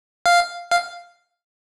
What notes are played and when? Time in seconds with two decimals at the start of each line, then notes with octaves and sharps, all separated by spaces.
0.26 F5
0.71 F5